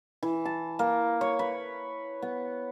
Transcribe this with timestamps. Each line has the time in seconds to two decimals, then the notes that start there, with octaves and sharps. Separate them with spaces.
0.23 E3
0.45 A5
0.79 A#3
1.21 C#5
1.39 B4
2.22 B3